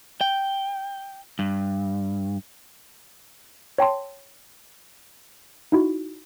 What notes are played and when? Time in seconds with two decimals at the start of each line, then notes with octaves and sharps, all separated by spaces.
0.21 G5
1.39 G2
3.78 C#5 G5 A5 C6
5.72 D#4 E4 F#4